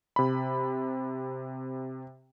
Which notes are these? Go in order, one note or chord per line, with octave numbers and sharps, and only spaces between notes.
C3 B5